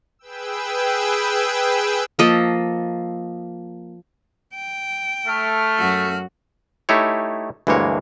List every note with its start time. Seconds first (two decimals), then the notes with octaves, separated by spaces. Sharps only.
0.19 G#4 B4 G5 E6
2.19 F3 A#3 A4 D#5
4.55 G5
5.27 A3 F6
5.78 F#2 F#4
6.89 A3 D#4 E4 G4 C#5
7.67 D2 G2 E3 G#3 A#3 C#5